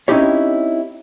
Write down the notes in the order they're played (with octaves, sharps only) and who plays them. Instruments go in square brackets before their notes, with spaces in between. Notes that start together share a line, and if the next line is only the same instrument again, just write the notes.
[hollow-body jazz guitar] C4 C#4 D#4 E4 G4 C#5